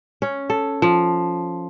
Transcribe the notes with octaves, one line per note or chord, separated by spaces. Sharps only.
C#4
A4
F3